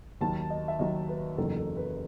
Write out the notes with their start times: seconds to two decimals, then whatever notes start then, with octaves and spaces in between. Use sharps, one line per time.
0.21 D#2 D#3 F#3 A5
0.50 D#5
0.68 E5
0.79 D#2 D#3 F#3 D#5
1.09 B4
1.38 F#1 E2 D#3 F#3 A4
1.57 A4
1.77 B4